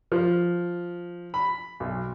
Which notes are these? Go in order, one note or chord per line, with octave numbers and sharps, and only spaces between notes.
F3
B5
B1